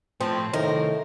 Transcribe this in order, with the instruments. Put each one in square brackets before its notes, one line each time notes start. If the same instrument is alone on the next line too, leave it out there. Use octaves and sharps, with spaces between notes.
[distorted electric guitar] A2 [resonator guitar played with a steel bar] F3 [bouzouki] C4
[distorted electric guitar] C2 D#3 [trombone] A2 [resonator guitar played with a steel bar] D#4 [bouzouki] A#4